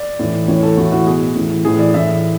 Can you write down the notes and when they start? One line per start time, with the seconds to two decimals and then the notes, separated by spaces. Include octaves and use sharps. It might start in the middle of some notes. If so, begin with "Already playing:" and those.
Already playing: D5
0.19 A2 E3
0.48 A2 E3 C#5
0.63 A4
0.77 A2 E3 F#4
0.92 F#4
1.07 B2 G#4
1.35 A2 E3
1.65 A2 E3 G#4
1.79 D5
1.94 A2 E3 E5